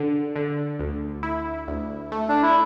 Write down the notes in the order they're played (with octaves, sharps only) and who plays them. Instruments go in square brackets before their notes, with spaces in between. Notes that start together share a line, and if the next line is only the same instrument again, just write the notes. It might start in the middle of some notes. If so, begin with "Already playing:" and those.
Already playing: [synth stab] D3
D3
D2
E4
D2
A3
[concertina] D4
E4